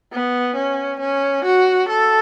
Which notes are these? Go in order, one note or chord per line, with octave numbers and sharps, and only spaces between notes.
B3
C#4
C#4
F#4
A4